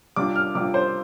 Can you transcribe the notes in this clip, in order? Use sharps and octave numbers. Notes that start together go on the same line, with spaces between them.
C3 G3 D4 F4 D6
F6
C3 G3 D4 F4 D6
C5